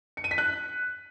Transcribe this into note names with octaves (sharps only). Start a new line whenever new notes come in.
C#7
D#7
B6
F#6